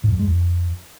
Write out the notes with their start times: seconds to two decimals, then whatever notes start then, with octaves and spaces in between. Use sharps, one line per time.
0.04 A2
0.11 F#2
0.19 G#3
0.27 F2